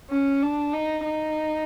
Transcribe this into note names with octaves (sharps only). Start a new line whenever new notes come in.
C#4
D4
D#4
D#4